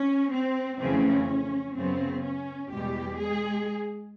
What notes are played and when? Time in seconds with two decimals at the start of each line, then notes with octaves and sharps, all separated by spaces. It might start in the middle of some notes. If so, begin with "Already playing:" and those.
Already playing: C#4
0.32 C4
0.79 F2 C#3 E3 A3 C4 C#4
1.76 F#2 C#3 F#3 B3 C4
2.24 C#4
2.72 E2 B2 G3 G#3 G4
3.19 G#3 G#4